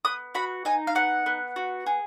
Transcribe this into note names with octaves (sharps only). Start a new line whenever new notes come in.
B3 D#6
F#4 B5
D#4 G#5
F5
B3 F#5
B3
F#4
G#4